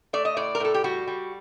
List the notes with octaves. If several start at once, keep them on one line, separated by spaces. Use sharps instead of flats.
A3 D5
D#5
A2 D5
A#4
A2 A4
G4
G3 F#4
G3